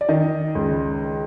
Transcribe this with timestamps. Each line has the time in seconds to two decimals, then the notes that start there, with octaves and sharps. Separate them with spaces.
0.01 D5
0.09 D#3 D#5
0.55 C#2